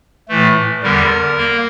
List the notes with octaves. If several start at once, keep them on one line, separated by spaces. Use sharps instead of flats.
A2 E3 A3
E2 D3 G3 A#4
A#3